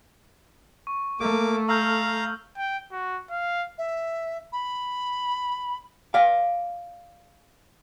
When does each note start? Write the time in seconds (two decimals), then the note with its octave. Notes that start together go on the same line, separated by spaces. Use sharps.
0.87 C#6
1.20 A3 A#3 D6
1.69 F5 A#5 E6 F6 G6
2.57 G5
2.92 F#4
3.31 F5
3.78 E5
4.52 B5
6.14 D5 F5